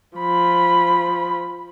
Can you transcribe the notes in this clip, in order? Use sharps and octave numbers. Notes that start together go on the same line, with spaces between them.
F3 B5